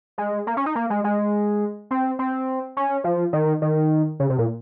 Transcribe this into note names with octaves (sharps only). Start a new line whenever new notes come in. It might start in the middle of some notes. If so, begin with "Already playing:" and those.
G#3
A#3
C#4
D#4
A#3
G#3
G#3
C4
C4
C#4
F3
D#3
D#3
C#3
C3
A#2